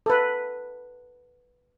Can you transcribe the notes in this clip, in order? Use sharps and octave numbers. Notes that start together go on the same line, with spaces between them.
A4 B4